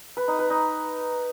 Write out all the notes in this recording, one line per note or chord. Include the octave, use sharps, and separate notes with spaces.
B4
D#4
B4
D#4